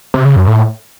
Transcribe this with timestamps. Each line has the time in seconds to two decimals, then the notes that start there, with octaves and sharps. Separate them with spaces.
0.14 C3
0.25 C#3
0.36 F#2
0.47 A2